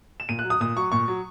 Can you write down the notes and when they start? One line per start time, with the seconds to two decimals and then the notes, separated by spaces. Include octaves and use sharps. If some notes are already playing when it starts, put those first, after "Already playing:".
0.20 E7
0.29 A#2 D#7
0.39 F#6
0.44 F#3
0.50 D#6
0.60 A#2 D#6
0.77 F#3 C#6
0.92 A#2 C#6
1.08 F#3